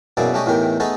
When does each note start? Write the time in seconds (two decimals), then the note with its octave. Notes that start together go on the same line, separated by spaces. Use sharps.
0.17 F#2 B2 A#3 E4 G#4 D5
0.34 A3 C#4 D4 G4 D#5
0.46 E2 A2 D#3 E3 G4 A#4
0.80 A3 B3 D#4 G#4 A4 D#5